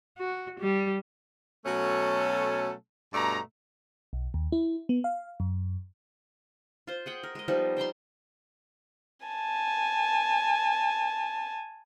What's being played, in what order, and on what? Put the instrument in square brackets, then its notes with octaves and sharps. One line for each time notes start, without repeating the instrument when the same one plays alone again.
[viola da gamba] F#4
G3
[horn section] B2 F#3 A3 C#4 A4
G2 B2 A3 D5 A#5
[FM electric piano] B1
D#2
E4
B3
F5
F#2
[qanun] F4 C5
G#4 F#5 G5
A#4
G#3 D#5
F3 G3 B3 D#4
C5 G5 A#5 C6
[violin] G#5 A5